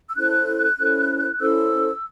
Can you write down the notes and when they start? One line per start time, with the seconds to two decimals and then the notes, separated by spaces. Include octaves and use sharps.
0.09 E6
0.16 C#4 E4 A4 C5 F#6
0.78 C#4 E4 A4 C5
1.39 C#4 E4 A4 C5 E6